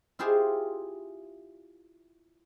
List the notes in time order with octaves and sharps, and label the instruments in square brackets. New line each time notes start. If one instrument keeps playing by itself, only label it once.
[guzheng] E4 F4 G4 G#4 C5 F5